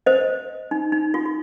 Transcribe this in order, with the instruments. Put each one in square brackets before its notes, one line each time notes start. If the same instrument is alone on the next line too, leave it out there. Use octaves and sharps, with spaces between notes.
[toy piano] C5 D#5
D#4
D#4
F4
F4